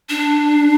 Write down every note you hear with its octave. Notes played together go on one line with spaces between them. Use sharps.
D4